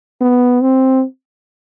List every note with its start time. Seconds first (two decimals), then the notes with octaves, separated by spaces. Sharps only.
0.21 B3
0.61 C4